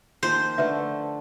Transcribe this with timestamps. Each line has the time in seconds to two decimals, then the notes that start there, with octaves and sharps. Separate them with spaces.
0.23 D#3 F3 A#3 C5
0.58 D3 A3 D4 F4 B4 E5